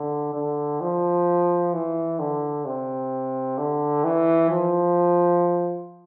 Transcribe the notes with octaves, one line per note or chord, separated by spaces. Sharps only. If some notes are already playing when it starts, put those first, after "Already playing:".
Already playing: D3
D3
F3
E3
D3
C3
D3
E3
F3